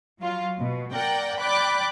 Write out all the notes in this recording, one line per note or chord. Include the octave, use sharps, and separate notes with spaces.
F#3 F4
B2
A#4 D5 F#5 G5
D5 G5 B5 D6 F#6